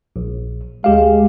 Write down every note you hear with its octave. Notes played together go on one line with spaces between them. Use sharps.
A#1
D2 G#3 G4 F5